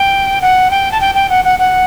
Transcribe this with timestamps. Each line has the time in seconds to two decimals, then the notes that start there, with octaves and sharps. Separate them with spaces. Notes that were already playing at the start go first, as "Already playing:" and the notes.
Already playing: G5
0.41 F#5
0.71 G5
0.92 A5
1.00 G5
1.15 G5
1.30 F#5
1.44 F#5
1.59 F#5